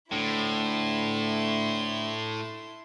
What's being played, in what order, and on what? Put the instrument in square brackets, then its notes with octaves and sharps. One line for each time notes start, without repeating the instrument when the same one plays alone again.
[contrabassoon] D2 [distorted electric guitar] A2 [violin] E4 C6